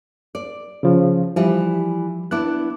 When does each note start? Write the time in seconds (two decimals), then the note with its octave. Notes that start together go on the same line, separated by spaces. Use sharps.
0.35 D5
0.83 C#3 F3
1.36 E3 F3 G3
2.31 B3 D4 E4 D6 F#6